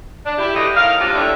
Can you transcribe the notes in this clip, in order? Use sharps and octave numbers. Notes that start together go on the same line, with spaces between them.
D4
E4 G4
D3 E3 A3 D4 G4 D#5
A2 D#4 A#4 F5
C3 A#3 D4 F4
A2 D3 G3 C#4 D4 E5